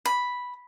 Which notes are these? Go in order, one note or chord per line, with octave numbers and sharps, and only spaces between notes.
B5